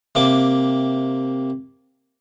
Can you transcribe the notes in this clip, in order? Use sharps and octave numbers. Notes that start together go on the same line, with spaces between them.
C3 A#3 D6